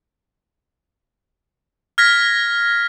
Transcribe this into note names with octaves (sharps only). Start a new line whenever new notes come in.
F6 G#6 A#6 B6